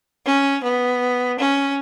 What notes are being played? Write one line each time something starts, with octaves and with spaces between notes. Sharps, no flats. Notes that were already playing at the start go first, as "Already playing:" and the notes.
C#4
B3
C#4